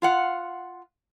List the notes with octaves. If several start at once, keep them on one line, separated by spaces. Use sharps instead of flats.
F4 F5 F#5